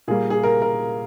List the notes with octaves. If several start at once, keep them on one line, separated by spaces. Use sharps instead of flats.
A#2 G3 A#3 G#4
G#4
A#4
A#4